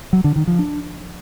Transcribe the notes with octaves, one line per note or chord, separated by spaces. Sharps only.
F#3
D3
D#3
F3
D4